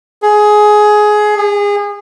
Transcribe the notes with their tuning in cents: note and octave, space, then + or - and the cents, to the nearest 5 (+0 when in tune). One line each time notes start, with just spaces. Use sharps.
G#4 +15
G#4 -30